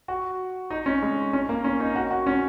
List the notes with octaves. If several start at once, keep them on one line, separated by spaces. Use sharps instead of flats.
F#4
D#4
C#4
G#3
C#4
A#3
C#4
D#4
F#4
F#4
C#4